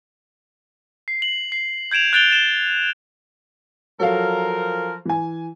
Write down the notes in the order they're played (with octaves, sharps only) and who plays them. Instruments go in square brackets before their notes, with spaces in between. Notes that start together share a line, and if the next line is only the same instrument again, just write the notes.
[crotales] C7
F#7
C7
G6 G#6 D7 E7 F7
F#6 G6 A6 D7 F7 G7
A6 E7 G7
[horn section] F3 A#4 [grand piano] F#3 A4 F5
[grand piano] E3 G#5